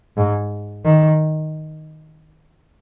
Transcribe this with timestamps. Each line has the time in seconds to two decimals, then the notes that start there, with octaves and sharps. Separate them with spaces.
0.17 G#2
0.85 D#3